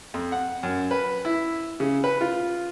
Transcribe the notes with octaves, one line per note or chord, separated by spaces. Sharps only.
F2
F#5
F#2
B4
E4
C#3
B4
F4